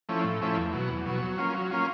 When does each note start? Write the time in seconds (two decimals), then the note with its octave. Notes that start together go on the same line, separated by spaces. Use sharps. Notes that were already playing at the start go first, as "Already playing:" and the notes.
0.09 F3 A3 C#4 E4
0.24 A2
0.41 F3 A3 C#4 E4
0.57 E2
0.73 B2 F#3
0.89 E2
1.05 B2 F#3
1.22 F#3
1.38 A#3 C#4 F4
1.54 F#3
1.71 A#3 C#4 F4